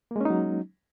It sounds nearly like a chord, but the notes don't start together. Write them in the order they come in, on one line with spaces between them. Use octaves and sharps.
A#3 G#3 C#4 D#4 F#3